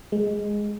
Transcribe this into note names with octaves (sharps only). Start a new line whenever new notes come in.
G#3